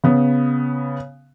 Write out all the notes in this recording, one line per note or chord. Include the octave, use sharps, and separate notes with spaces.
C#3 B3